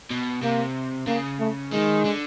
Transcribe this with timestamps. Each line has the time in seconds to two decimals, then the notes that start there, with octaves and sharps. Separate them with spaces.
0.11 B2
0.42 C3 A#3
1.07 C#3 A#3
1.39 A3
1.72 D#3 G#3
2.05 D3